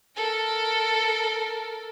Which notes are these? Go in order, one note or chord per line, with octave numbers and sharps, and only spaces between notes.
A4 A#4